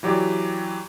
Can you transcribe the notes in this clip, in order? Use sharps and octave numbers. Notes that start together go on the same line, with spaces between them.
E3 F#3 G4 D5